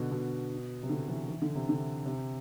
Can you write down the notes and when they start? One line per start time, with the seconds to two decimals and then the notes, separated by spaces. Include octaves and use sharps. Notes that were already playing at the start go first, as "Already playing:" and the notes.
Already playing: B2 D3
0.11 B2
0.83 C3
0.89 D3
1.08 E3
1.28 E3
1.42 D3
1.55 C3
1.69 D3
2.06 C3